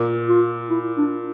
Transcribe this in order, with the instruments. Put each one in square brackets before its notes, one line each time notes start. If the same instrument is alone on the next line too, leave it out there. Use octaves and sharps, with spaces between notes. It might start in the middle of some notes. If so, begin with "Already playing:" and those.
Already playing: [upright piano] A#2
[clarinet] F4
E4
D4